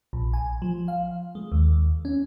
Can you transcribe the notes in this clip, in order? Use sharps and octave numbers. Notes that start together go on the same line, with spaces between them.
A#1
G#5
F3
F5
G#3
D#2
C#4